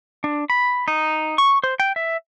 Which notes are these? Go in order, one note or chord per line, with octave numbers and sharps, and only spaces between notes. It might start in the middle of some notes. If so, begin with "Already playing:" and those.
D4
B5
D#4
C#6
C5
G5
E5